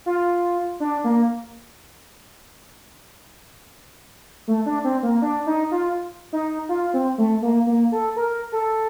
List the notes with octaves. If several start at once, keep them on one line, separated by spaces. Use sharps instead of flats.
F4
D4
A#3
A3
D4
C4
A#3
D4
D#4
F4
D#4
F4
C4
A3
A#3
A#3
A4
A#4
A4